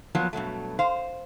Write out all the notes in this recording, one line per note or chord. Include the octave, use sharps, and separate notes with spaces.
F3 F#3 A#3 B3 F#4
G2 B2 F#3 A3
C5 F5